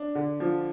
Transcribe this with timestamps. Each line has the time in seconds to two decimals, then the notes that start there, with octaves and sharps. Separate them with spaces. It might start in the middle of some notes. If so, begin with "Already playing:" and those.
Already playing: D4
0.15 D3
0.40 F3